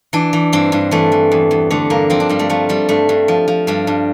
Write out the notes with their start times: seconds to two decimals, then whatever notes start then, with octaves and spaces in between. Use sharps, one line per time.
0.13 E3 D4
0.33 E3
0.53 G2 C4
0.72 G2
0.91 E3 A3
1.12 E3
1.32 E2
1.51 E2
1.70 D3 A3
1.90 G2 A#3
2.10 F3 C4
2.20 D4
2.29 G2 G3
2.39 A3
2.50 F3 A3
2.69 F3 G3
2.89 G2 A3
3.09 G2
3.28 F3
3.48 F3
3.67 G2 G3
3.87 G2